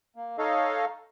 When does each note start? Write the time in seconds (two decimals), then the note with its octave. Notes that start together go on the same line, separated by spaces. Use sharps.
0.16 A#3
0.38 D#4 A4 C#5 D#5 F5